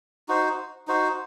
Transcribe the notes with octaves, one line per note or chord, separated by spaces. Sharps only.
D#4 F#4 C5
D#4 F#4 C5